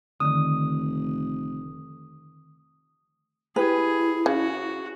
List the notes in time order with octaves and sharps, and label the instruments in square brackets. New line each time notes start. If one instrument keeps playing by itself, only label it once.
[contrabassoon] F1 [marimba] D3 D#3 [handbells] D#6
[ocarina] E4 [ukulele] G4 B4 [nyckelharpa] G#4
[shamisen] C#3 [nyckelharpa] F#4